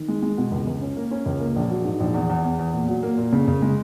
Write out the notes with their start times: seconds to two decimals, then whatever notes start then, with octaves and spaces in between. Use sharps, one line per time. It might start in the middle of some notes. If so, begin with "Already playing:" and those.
Already playing: D#3
0.08 G#3
0.22 G#3
0.38 B2
0.52 C#2
0.67 C#2
0.82 C#4
0.97 A#3
1.11 C#4
1.26 C#2
1.40 A#3
1.56 A#1
1.70 F#3
1.85 G#2
2.00 A#1
2.14 E2
2.30 E2
2.44 E2
2.59 E2
2.73 A#2
2.88 F#3
3.03 A#3
3.18 A#2
3.33 C#3
3.48 C#3
3.62 G#3